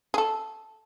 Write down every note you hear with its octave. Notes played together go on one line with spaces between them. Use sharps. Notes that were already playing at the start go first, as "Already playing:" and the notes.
G#4
A4